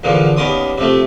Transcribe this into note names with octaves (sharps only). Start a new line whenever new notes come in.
E2 A#2 D3 F3
D#2 B3 C#4 D5 C6 D#6
C3 F3 A3